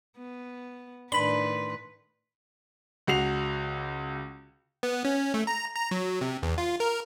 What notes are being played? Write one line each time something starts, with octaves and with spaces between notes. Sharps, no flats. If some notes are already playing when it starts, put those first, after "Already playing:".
B3
A2 D#3 D4 B4 B5 C6 B6
C#2 F#4 C7 F7
B3
C#4
A3
A#5
A#5
F#3
C3
E2
F4
A#4